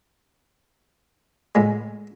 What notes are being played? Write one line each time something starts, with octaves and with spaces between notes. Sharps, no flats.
A2 G#3